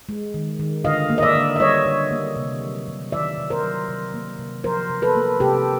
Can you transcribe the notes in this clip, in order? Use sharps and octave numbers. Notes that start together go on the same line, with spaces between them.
G#3
D#3
D#3
D3 D#5 F5
A#3
D#5
D5 E5
D3
E5
G3 C#5 D#5
D3
A#3
C3
F#3
C3
D#3 D5 E5
C3
A#4 C5
F#3
C3
A#3
C3
F3 A#4 C5
C3
A4 B4
A#3
C3 G4 A4